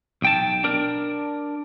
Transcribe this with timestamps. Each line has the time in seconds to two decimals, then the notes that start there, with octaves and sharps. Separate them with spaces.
0.22 B1 G5 A5
0.64 D4 A#4